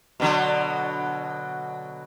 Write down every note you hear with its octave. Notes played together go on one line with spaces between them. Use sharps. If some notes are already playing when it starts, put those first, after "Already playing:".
B2 D3 F#3